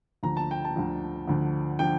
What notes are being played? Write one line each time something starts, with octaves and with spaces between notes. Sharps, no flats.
D2 D3 F3 A#5
A5
G5
A5
D2 D3 F3
D2 D3 F3
D3 F3 G5